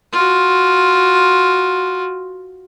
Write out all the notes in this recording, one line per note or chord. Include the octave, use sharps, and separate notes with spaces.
F4 F#4